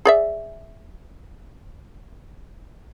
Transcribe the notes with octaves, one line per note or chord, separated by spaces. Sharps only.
G#4 D5 E5